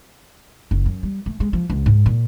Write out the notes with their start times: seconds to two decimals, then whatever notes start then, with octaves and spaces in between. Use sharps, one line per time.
0.71 F#1
0.86 F#2
1.03 G3
1.26 A3
1.40 G#3
1.53 F3
1.70 C#2
1.86 G#2
2.06 A#2